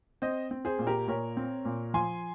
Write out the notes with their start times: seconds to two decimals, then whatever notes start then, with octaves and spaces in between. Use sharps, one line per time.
0.22 C4 C5 D#5
0.51 C4
0.65 G#4 C5
0.79 A#2
0.87 G4 A#4
1.07 A#2 A#4 C#5
1.37 C4
1.65 A#2
1.94 F3 G#5 C6